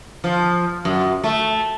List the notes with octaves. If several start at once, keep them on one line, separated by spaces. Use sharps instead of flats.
F3
F#2
A3